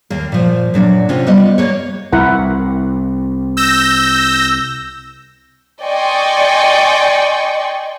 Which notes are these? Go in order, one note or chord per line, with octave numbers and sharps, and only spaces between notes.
D#2 A#3
A#2 F3
A#2 F#3 D4
C3 C#4 F4
G3 B3 F4 D#5
A#3 B4 C#5
C2 E4 A#4 F#5
E6 G6 A#6
D5 D#5 G5 G#5 C6 C#6